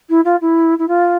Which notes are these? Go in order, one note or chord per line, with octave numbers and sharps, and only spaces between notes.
E4
F4
E4
E4
F4